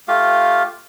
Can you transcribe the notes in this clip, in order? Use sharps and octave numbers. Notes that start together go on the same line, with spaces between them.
A3 F4 G4 F5